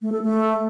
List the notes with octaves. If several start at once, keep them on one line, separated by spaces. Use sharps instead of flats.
A3
A4
A3